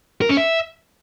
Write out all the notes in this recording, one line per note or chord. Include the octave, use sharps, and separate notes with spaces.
A#4
C#4
E5